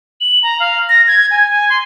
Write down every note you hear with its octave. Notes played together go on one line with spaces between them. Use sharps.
F#7
A#5
F5
A#6
G#6
G#5
G#5
C6